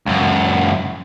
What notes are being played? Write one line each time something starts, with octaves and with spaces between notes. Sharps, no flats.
C#2 F#2